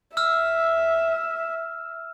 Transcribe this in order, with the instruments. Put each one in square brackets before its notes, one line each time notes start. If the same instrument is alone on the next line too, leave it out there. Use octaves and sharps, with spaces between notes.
[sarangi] E5 [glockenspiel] E6 F6